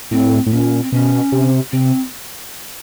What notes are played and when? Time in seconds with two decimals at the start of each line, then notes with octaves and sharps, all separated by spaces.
0.11 A2 C4
0.46 A2
0.52 A#2 C#4
0.83 C4
0.92 B2 C#4
1.32 C3
1.72 C3 C4